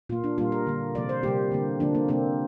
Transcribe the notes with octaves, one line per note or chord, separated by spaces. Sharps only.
A#2 A#3 F4
D4
A#2 G3 A#3 F4
A#4
D3 A#3
C3 F3 A#3 D5
C5
C3 G3 A#3 G4
D3 A#3
D3 F3 A#3 D4
A#3
C3 A#3 C4